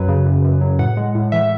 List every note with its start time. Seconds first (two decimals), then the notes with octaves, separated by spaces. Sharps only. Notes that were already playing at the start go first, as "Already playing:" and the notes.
Already playing: F#2 F#3 B4
0.08 C#3
0.26 F#2
0.44 F#2
0.61 F#3
0.79 A2 F#5
0.97 G#3
1.15 A2
1.32 E3 E5